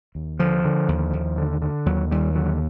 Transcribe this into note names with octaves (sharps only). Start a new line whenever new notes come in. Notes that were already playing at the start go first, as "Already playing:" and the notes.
D#2
D3 F3
D3
D#2
D#2
D3
D3
D#2 F#3
D#2 G3
D3 F#3